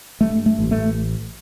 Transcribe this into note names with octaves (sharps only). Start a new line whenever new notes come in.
G2 A3
A3
A1
A3